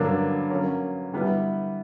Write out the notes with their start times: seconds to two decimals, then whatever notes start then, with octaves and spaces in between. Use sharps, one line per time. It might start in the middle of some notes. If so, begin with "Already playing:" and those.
Already playing: G2 D3 F#3 A#3 D4
0.50 F#3 A#3 C#4
1.13 D3 G3 B3 E4 B4